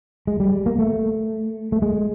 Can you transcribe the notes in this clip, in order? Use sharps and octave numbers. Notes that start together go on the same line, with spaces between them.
G#3
G3
A#3
A3
A3
G#3